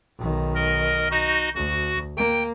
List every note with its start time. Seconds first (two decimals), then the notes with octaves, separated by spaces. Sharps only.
0.19 B1 D#3
0.55 A#4 D#5
1.11 D#4 F#4 D#5
1.55 D2 F#4
2.17 A#3 G5